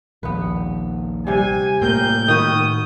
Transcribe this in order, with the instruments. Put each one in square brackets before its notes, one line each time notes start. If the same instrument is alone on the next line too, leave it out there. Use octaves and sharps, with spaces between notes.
[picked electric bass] A#1 D#2 [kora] B3 B4
[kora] C3 G3 [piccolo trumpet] G#5
[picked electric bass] A2 A#3 [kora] C4 A#4 [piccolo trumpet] G6
[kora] D#3 F#4 B4 [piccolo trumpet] D#6